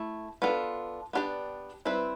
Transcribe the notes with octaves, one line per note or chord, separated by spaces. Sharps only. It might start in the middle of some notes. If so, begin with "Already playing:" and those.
Already playing: A3 E4
B3 D4 F4 A4
B3 D4 G4 D5
G3 C4 E4 B4